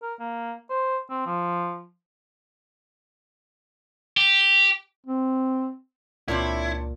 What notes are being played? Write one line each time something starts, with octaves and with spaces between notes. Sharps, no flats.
A#4
A#3
C5
C4
F3
G4
C4
C#2 A#2 C4 D4 E4 C#5